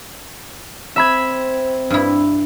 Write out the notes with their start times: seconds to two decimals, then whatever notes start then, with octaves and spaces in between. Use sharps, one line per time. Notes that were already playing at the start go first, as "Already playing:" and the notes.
0.96 C4 E5 B5 G#6
1.90 G2 E4